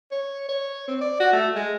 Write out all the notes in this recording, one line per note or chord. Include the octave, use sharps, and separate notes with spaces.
C#5
C#5
C4
D5
F#4
A3
G#3